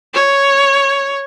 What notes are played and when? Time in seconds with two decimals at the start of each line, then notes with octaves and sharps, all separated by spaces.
0.14 C#5